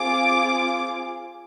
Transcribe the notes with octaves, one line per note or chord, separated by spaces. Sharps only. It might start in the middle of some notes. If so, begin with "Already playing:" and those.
Already playing: C4 F4 G#4 D6